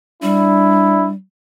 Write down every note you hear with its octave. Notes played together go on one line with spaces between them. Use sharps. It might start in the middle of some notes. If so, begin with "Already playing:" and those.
G3 D4 E4